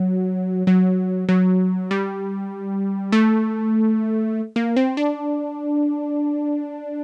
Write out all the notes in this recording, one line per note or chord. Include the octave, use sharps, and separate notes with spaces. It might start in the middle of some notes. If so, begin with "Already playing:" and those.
Already playing: F#3
F#3
F#3
G3
A3
A#3
C4
D4